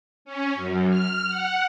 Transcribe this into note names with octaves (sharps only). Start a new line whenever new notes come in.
C#4
F#2
F6
F#5